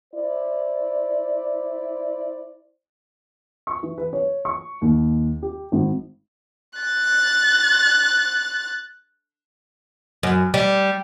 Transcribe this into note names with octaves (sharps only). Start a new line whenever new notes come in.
E4 C5 D5
C#6
E3
B4
C#5
C#6
D#2
G4
G#1
F#6 A6
F#2
G3